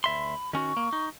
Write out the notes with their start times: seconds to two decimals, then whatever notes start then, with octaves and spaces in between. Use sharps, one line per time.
0.04 D2 E5 B5 C6
0.53 D#3 C#4 F#4 C#6
0.77 A#3
0.93 D#4